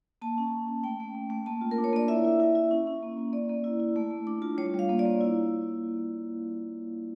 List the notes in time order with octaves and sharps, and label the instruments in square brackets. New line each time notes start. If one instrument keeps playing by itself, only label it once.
[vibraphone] A#3 A5
C#4
C#4
C#4
A3 G5
A3
A3
A3
A#3 A5
F4
A#4
D4
C#5
A#3 D5
E4 E5
E4
E4
E4
C#4
C#4
A#3
A#3
A#3 D5
A#3
E4
E4
A3
A3
D4
F4
G3 C#5
G3
F5
A#3
D5
A#3
E4